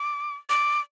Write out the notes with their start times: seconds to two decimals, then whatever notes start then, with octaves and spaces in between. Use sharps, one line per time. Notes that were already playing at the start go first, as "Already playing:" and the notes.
Already playing: D6
0.50 D6